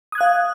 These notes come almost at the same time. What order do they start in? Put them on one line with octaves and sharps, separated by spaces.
D#6 G#6 F#6 F5